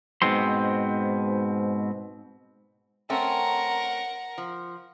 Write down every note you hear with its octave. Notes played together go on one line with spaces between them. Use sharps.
G#2 B2 C4 C6
A3 C4 C#4 A#4 F#5
F3